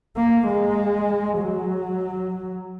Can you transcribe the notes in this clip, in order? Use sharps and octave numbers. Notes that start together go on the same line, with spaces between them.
A#3
G#3
F#3